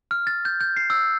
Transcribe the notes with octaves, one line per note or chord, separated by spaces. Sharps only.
F6
A6
G6
G6
C7
E6